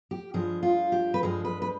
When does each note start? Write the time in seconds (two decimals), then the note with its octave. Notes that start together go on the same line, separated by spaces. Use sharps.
0.11 G4
0.34 G2 F3 G#3 G#4
0.63 F4
0.92 G4
1.14 B4
1.22 G2 F3 G#3 G#4
1.45 B4
1.62 B4